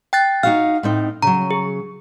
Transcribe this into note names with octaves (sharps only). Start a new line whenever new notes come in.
G5 F#6 A6
D#4 F#4 F5 F6
A2 C4 D#4
C#3 F#3 A#5
G#4